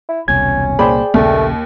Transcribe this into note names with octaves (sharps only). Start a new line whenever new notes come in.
E4
E1 C2 B2 C#4 G#6
C2 A#2 A#3 G#4 C5 D5 G5 B5
A#1 D#2 C#3 A3